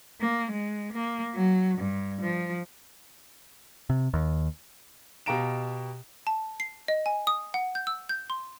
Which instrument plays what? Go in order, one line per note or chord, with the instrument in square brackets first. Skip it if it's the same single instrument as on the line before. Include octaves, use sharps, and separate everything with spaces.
[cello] A#3
G#3
A#3
F#3
G2
F3
[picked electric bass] C3
D#2
[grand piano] B2 G4 F5 A#5 D7 E7
[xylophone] A5
C7
D#5
G#5
D#6
F#5
G6
E6
G6
C6